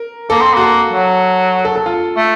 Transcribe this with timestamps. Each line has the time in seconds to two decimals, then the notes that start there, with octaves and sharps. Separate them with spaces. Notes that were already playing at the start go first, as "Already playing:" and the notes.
Already playing: A#4
0.30 A#3 A4
0.42 C4
0.54 A#3 F#4
0.61 A4
0.92 F#3
1.65 A4
1.76 A4
1.86 F4
2.17 A3